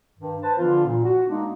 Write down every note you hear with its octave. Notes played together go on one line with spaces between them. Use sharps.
G2 D#3
B4 C5 A5
D3 E3 F3 B3 D4 F4
A#2
F#4
G#3 A#3 B3 D4 D#4